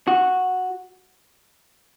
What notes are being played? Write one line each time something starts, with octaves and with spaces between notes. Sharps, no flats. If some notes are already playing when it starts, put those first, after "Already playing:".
F#4